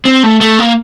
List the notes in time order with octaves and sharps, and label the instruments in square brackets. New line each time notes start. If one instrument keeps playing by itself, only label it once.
[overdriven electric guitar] C4
A3
A3
A#3